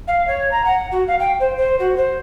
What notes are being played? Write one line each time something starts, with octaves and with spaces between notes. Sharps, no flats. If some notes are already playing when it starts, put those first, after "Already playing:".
F5
C#5
A#5
F#5
F#4
F5
G5
C5
C5
F#4
C5